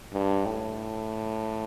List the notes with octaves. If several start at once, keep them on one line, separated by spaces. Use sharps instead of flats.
G2
A2